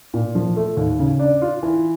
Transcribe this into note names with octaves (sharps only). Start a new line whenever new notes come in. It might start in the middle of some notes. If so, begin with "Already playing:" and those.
A#2
F3
A3
D#2
C#3
D4
F4
E3